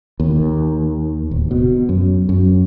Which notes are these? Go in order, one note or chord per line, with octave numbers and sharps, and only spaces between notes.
D#2
D1
B2
F#2
F#2